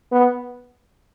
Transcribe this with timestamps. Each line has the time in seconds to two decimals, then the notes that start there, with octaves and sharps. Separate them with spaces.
0.12 B3